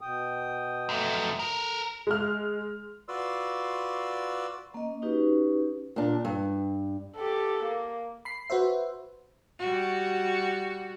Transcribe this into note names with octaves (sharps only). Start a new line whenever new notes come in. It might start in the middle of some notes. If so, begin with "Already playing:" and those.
B2 G5 D#6
F#2 A3
A4 A#4
G#3 F6
F4 F#4 B4 D5 C6 E6
A#3 C#4 D#5
C#4 D#4 F#4 G4 B4
A#2 D4
G2
G4 A4
A#3
B5 C7
F#4 B4 C5 E5
G3 F#4